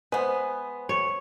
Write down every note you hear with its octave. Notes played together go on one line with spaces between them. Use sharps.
G#3 B3 B4 C5 G#5
C#5